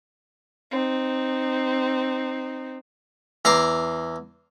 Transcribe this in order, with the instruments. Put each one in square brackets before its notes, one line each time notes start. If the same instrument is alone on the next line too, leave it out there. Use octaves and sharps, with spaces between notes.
[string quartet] C4 D#4
[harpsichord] E2 A#5 C6 D6